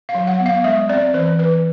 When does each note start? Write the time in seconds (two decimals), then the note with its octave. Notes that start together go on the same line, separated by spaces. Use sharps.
0.09 F5
0.15 F#3
0.27 F#5
0.40 B3
0.46 F5
0.64 G#3 E5
0.89 C4 D5
1.14 E3 C5
1.39 E3 B4